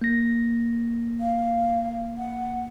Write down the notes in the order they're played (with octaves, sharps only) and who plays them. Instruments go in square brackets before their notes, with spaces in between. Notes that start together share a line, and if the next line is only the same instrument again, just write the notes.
[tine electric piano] A#3 A#6
[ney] F5
F#5